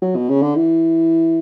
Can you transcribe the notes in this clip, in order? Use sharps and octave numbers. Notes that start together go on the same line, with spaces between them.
F#3
B2
C#3
D3
E3